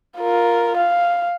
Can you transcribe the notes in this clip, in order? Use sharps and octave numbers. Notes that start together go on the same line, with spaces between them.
F4 A#4
F5